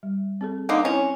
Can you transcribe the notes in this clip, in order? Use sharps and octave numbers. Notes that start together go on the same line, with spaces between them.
G3
C4 G#4 A4
D3 A#3 D#4
C4 C#4 E4